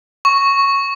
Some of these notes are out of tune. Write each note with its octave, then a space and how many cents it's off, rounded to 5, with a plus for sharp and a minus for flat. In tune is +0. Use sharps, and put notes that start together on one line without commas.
C#6 +0